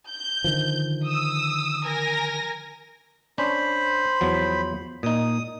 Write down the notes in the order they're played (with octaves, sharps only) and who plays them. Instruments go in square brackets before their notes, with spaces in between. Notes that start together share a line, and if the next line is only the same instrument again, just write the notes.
[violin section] G6
[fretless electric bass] D3 D#3 F3
[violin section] D#6 E6
A#4 G#5 A#6
[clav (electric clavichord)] C#4 D4 [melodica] C5 B5
[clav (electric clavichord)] E2 F3 F#3
[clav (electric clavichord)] A#2 D#4 [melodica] D#6